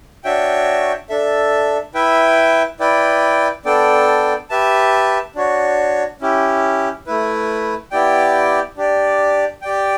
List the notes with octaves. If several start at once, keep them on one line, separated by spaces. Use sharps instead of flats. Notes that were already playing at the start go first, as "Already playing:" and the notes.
D4 F#4 C#5 E5 G5
D4 A4 E5
E4 B4 E5 G5
E4 B4 D5 G5
B3 D4 A4 D5 G5
G4 B4 E5 A5
D4 F#4 C#5
C#4 E4 G4
A3 E4 B4
B3 E4 G4 D5 G5
D4 G4 D5
G4 D5 G5